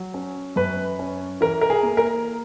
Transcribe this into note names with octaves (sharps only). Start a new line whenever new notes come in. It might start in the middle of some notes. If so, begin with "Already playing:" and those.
Already playing: F#3
C#4
F#2 B4
C#4
E3 A#4
A#4
G#4
A#3
A#4